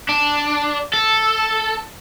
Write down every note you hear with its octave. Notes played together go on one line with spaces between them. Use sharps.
D4
A4